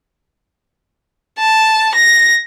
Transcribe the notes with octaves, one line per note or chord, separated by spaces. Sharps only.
A5
A#6